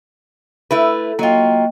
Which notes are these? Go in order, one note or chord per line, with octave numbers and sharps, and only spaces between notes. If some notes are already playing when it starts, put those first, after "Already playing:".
A3 E4 B4
F#3 A#3 F4 D#5 G5